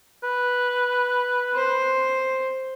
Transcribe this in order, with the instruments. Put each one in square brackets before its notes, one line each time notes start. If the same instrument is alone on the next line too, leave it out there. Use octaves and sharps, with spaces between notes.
[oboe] B4
[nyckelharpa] C5